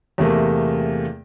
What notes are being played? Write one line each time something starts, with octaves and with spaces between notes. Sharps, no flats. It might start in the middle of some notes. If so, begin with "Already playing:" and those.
E2 C3 A3 A#3